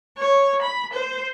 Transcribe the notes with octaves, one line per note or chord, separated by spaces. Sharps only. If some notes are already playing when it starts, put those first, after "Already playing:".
C#5
B5
C5